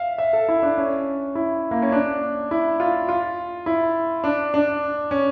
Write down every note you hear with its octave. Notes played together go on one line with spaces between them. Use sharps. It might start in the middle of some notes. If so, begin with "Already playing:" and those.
Already playing: E5 F5
E5
A4
E4
D4
C#4
E4
A#3
C#4
D4
E4
F4
F4
E4
D4
D4
C#4